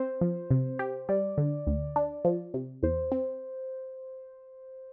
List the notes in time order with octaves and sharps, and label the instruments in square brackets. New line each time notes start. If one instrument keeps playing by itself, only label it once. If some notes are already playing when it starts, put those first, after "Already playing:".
Already playing: [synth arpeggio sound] C4 [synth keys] C5
[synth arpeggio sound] F3
C3
G4
[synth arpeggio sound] G3 [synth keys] D5
[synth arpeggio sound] D3
D2
D4
F3
C3
[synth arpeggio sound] E2 [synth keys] C5
[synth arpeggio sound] C4